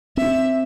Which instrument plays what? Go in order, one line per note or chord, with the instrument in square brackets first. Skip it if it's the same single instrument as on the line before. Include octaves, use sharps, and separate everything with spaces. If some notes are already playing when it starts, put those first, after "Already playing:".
[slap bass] C4 [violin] E5